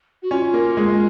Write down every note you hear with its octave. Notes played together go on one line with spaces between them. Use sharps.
F#4
C#4 F4
A#3
G#3